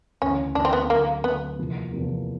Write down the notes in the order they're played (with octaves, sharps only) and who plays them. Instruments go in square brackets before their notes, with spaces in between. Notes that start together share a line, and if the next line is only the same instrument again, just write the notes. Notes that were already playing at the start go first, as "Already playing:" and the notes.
[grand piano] D2 C#3 E3 [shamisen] C#4
[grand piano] D2 C#3 E3 [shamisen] D4
[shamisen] C4
B3
[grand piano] D3 F#3 A3 C4 [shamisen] A#3
[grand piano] D3 F#3 A3 C4 [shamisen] B3
[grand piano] E2 C3 F3 A#3
E2 C3 F3 A#3